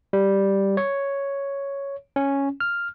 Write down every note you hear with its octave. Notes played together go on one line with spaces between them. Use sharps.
G3
C#5
C#4
F6